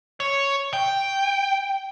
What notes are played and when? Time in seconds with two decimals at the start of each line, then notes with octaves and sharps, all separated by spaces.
0.20 C#5
0.73 G5